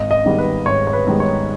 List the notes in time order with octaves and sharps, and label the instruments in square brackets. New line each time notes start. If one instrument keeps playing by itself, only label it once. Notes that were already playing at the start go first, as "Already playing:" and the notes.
Already playing: [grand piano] G#1 D#5
D#5
G#2 D#3 G3 B3
B4
G#1 C#5
C#5
B4
G#2 D#3 G3 B3
C#5